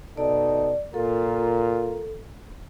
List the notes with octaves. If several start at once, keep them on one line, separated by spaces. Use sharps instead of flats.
B2 D#4 A4 D5
A#2 F4 A4 A#4